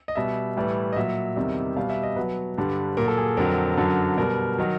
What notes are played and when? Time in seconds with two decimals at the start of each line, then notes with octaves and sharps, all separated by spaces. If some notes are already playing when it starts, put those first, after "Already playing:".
0.08 D#5
0.16 B2 G3 E5
0.57 A2 E3 G3
0.93 D#5
0.96 A#2 F#3 E5
1.36 E2 C3 D#3 G3
1.76 B2 G3 F5
1.90 E5
2.03 D#5
2.16 B2 F#3 B4
2.58 G2 D3 G3
2.97 A#2 F#3 A#4
3.08 A4
3.18 G#4
3.37 F2 D3 F#3 A#4
3.77 F#2 D3 F#3
4.17 B2 G3 A#4
4.59 D#3 F#3